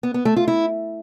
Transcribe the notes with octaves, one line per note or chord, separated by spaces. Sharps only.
B3
B3
A3
F4
E4